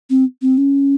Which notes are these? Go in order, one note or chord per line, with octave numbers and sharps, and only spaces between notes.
C4
C4
C#4